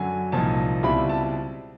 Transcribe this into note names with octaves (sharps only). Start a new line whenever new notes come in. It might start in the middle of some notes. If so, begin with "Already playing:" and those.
Already playing: F#2 D3 F#3 G#5
C2 A#2 F3 A#3 D#4 A5
C#2 B2 G3 C4 E4 B5
A5